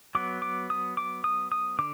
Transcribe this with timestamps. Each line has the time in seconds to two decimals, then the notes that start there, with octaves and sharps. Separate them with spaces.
0.15 F#3 B3 D6
0.42 D6
0.70 D#6
0.97 D6
1.24 D#6
1.52 D#6
1.79 D3 D6